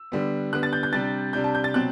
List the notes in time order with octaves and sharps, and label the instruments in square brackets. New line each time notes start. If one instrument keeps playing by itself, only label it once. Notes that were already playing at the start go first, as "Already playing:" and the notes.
Already playing: [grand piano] E6
D3 G3 B3
D3 G3 B3 F#6
A6
G6
G6
C3 G3 D4 A6
C3 G3 D4 G6
A5
G6
A6
B2 F#3 C4 F#6